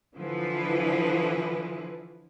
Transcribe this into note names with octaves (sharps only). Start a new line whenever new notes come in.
D3 E3 F3 E4 B4